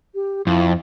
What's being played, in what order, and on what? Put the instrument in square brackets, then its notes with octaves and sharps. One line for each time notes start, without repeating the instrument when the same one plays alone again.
[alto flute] G4
[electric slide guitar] F2 [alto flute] E4